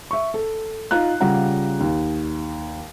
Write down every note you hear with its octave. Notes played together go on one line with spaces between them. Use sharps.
E5 C#6
A4
D#4 F4 A#5 F#6
C#3 G3 F4 F#5 A#5
D#2